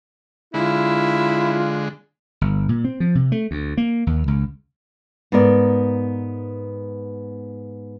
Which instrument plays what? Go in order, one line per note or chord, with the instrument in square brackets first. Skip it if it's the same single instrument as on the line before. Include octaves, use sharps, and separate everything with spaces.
[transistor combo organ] D3 G#3 [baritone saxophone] E4 [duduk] F4
[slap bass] G1
A#2
C4
F3
C3
A3
D2
A#3
D#2
C#2
[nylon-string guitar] G#2 B3 A#4 D5